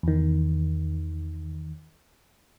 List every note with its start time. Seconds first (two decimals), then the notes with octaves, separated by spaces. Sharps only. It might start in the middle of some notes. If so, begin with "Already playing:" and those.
0.03 E2 D#3